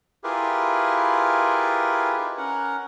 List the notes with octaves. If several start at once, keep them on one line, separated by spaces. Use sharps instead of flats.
E4 F4 G4 G#4 A#4 B4
D#4 B4
C#4 A#4 F#5